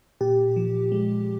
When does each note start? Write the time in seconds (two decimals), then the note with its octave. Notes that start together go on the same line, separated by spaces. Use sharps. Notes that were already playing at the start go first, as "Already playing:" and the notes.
0.21 A#2 G4
0.56 F3
0.92 G#3